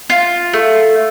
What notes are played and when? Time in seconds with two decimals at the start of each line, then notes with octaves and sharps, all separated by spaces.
0.10 F4
0.53 A3